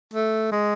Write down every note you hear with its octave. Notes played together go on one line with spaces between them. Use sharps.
A3
G#3